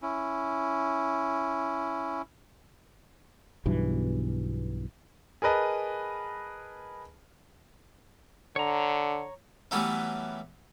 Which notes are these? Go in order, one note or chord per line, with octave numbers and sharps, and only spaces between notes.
C#4 E4
B1 G2 B2 E3
G#4 A#4 B4 D#5 A5
D3 C#5 A#5
E3 F#3 G3 A3 B3 C#4